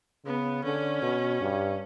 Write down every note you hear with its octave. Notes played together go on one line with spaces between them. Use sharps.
C#3 B3
D3 C#4
B2
G2